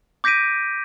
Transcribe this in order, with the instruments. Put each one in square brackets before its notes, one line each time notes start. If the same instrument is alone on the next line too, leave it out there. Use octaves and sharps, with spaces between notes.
[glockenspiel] D6 G6 A#6 B6 D7 D#7